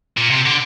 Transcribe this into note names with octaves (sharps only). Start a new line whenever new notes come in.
A#2
C3
D3